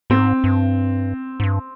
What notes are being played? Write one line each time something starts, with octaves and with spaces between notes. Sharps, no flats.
G#2 C4
G2
G#2
G2